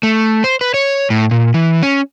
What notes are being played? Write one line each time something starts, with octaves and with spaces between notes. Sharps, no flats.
A3
C5
B4
C#5
A2
A#2
E3
C#4